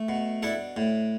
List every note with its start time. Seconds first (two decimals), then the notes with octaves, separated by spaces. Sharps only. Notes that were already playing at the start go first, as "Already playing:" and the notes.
Already playing: A3
0.09 B2
0.43 D4 E4 A4
0.77 A2